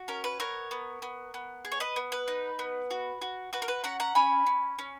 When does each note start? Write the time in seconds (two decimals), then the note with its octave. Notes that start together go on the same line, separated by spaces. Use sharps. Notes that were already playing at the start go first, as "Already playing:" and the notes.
Already playing: F#4
0.08 C#4 A#4
0.24 B4
0.40 B3 A#4 C#5
0.71 B3
1.02 B3
1.34 B3
1.65 G#4
1.72 C#5
1.80 B4 D#5
1.96 B3
2.12 B4
2.28 D#4
2.59 B3
2.91 F#4
3.22 F#4
3.53 F#4 B4
3.62 A#4
3.68 B4
3.84 C#4 F#5 A#5
4.00 F#5 A#5
4.15 C#4 G#5 B5
4.46 C#4
4.79 C#4